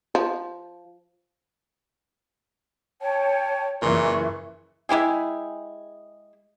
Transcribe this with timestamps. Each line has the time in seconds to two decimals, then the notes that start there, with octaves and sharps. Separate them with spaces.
0.15 F3
3.01 C#5 G5 A5
3.82 F#1 A#2 E3 C#6
4.89 G#3 E4 G4 G#4